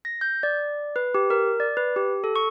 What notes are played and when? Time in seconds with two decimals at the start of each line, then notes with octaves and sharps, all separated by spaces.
0.05 A#6
0.21 G6
0.43 D5
0.96 B4
1.15 G4
1.30 A#4
1.60 D5
1.77 B4
1.96 G4
2.24 A4
2.36 C#6